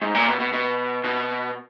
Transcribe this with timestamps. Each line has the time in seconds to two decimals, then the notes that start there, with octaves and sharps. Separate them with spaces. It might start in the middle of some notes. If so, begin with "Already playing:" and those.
0.02 G#2
0.15 A#2
0.28 B2
0.40 B2
0.53 B2
1.04 B2